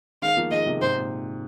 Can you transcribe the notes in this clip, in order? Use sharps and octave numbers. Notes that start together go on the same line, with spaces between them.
D#3 G#3 F5
F3 A#3
D#3 G#3 D#5
C3 F3
G#2 C3 C5
A#2